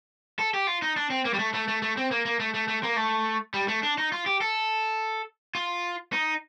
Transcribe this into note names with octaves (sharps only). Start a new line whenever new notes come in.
A4
G4
F4
D#4
D4
C4
A#3
G3
A3
A3
A3
A3
C4
A#3
A#3
A3
A3
A3
A#3
A3
G3
A3
D4
D#4
F4
G4
A4
F4
D#4